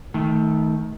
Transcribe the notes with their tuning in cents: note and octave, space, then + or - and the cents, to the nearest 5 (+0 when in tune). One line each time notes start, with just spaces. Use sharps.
D#3 +20 A3 -10